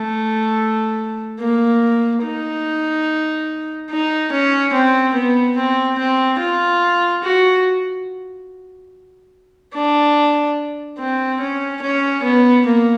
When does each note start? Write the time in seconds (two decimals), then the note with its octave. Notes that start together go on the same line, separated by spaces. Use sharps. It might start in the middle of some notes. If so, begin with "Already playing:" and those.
Already playing: A3
1.39 A#3
2.23 D#4
3.90 D#4
4.32 C#4
4.73 C4
5.14 B3
5.57 C4
5.98 C4
6.39 F4
7.23 F#4
9.74 D4
10.99 C4
11.40 C#4
11.82 C#4
12.23 B3
12.66 A#3